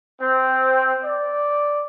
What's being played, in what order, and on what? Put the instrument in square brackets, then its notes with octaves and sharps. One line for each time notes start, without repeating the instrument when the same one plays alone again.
[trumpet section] C4
D5